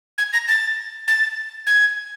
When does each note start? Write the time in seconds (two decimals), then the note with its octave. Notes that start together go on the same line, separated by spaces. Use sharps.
0.18 G#6
0.33 A#6
0.48 A6
1.08 A6
1.67 G#6